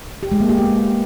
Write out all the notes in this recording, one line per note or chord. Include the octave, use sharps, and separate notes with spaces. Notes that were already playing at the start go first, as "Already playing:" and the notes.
G4
G#3
A#3
G4
B3